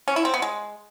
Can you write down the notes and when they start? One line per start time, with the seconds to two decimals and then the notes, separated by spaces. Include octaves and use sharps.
0.08 C#4
0.16 E4
0.25 C4
0.34 B3
0.42 G#3